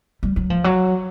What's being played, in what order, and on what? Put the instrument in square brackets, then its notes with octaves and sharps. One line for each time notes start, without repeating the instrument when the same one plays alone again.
[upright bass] G3
F#3
F3
F#3